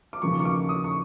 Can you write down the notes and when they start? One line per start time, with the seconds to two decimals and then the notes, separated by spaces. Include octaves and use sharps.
0.13 D6
0.22 D#2 C#3 F3 A#3 C#6
0.40 C#6
0.45 D6
0.69 D#6
0.84 C#6